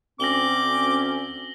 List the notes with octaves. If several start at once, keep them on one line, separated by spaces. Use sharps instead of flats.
D2 C4 C#4 D6 A#6 F#7 G7